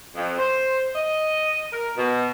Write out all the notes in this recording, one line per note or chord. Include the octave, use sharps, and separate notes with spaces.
F2
C5
D#5
A#4
B2